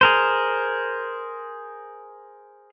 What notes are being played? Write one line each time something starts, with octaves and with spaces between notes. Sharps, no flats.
G#4 A#4 C5